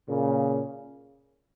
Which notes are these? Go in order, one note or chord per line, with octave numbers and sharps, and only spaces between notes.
A#2 C#3